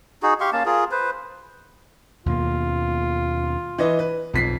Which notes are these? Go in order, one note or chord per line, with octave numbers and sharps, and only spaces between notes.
D#4 F#4 G#4
G4 F5 C6 C#6
A#3 C#4 F5 A5
F4 G#4 A#4
B4 C5
D#2 B2 A#3 F4
E3 B4 D#5
B4
B1 F2 B6 C7